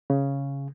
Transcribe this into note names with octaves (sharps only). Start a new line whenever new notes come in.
C#3